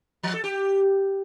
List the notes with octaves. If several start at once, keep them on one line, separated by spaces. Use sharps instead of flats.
F3
A4
G4